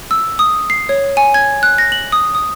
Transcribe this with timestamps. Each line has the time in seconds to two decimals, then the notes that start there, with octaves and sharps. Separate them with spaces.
0.11 E6
0.39 D#6
0.70 C7
0.89 C#5
1.17 G#5
1.34 G#6
1.63 F#6
1.78 A#6
1.92 F#7
2.12 D#6
2.35 D#6